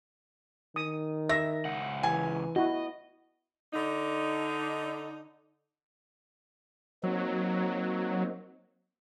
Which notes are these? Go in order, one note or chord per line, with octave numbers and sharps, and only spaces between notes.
D#3 D#6
E5 A#6
C#2 F#5
E3 G#5
E4 F#4 D#5
D3 D#4
F#3 A#3 C4 D#4